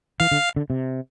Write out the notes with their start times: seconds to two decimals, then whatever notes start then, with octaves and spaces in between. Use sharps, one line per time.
0.20 E3 F5
0.31 D3
0.56 D3
0.70 C3